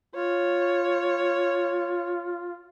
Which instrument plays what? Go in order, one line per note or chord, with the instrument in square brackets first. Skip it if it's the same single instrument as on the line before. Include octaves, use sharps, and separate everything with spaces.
[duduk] F4 [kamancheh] C#5